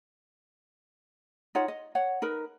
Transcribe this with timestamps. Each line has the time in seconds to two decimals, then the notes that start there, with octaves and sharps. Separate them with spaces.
1.55 D#4 F4 C#5 F#5
1.68 D#5
1.95 C#5 F#5
2.22 D#4 A#4 B4